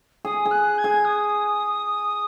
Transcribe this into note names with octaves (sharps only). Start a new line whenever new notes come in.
G#4 D#6
G#4
F#6
G#6
G#4
D#6